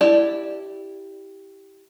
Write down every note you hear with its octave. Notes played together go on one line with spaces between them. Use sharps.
E4 G4 D5 A5